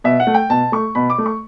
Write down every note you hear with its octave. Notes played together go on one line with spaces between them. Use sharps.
B2 E5
F#5
A3
G5
B2 A5
A3 C#6
B2 B5
D6
A3
C#6